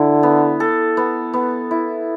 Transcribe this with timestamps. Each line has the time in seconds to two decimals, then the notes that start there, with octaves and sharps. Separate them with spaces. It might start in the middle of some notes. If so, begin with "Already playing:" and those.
Already playing: D3 E4
0.23 B3
0.60 A4
0.97 B3
1.34 B3
1.71 E4